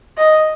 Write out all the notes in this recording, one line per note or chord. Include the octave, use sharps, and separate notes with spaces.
D#5